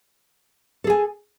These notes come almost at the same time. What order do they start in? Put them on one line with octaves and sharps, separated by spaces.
A4 G#4 G#5